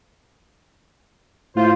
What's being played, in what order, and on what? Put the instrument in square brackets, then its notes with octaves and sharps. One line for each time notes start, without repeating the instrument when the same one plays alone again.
[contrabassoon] A2 [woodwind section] F4 C5